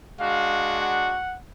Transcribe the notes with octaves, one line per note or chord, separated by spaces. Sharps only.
G#3 D4 F#4 F5
F#5